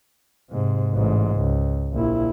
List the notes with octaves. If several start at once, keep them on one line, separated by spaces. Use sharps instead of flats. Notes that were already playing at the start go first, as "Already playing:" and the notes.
G#2 C3
A1 G#2
C#2
A#1 E4